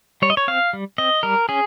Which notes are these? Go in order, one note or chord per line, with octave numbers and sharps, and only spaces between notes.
G3 C#5
D#5
C#5
C4 F5
G3
C4 D#5
G3 A#4
C#4 G#4